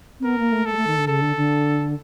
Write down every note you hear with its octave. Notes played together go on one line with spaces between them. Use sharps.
C4
B3 A#4
A#3
A3
A3 A4
G#3
A3
D#3
D3
C#3 A4
D3
D3